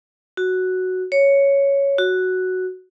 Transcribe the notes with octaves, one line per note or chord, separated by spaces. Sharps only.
F#4
C#5
F#4